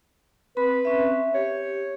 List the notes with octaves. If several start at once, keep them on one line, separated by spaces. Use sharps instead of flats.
C4 B4 B5
C4 C#4 E5
G4 C#5